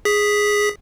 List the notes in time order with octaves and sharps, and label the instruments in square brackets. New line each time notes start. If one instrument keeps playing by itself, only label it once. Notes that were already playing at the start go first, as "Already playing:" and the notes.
[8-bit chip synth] G#4 B6